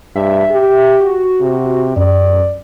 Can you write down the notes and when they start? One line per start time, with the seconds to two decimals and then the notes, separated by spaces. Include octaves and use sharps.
0.16 G2 E5
0.51 G4
1.00 F#4
1.41 C3
1.97 F#2 D5